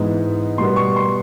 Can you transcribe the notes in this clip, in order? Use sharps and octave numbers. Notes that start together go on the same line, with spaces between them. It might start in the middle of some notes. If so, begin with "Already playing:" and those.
Already playing: G#2 E3 G#3 B3
B2 G3 B3 C6
C#6
C6